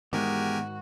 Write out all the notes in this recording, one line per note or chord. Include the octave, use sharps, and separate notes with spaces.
E2 G#2 D#3 G#3 F#4 G4 A#4 G#5